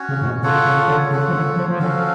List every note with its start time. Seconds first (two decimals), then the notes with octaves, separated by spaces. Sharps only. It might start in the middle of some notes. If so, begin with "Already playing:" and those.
Already playing: C#4 F#4 C#5
0.09 C#3
0.22 A2
0.26 B2
0.43 C#3 F4 A4 C#5 F#5
0.65 C#3
0.88 D3
1.11 C#3 F4 A4 C#5 F#5
1.28 F3
1.33 D3
1.56 F3
1.68 F3
1.79 D3 C#4 F#4 A4 F5